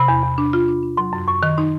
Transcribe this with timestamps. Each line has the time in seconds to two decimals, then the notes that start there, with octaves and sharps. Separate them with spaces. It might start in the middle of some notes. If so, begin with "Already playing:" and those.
Already playing: C3 B5
0.08 E2
0.23 E2
0.38 D4
0.53 F4
0.68 D4
0.83 D4
0.97 F#3 C6
1.13 F#2
1.28 F#2 C#6
1.43 D#3
1.57 D#4 C6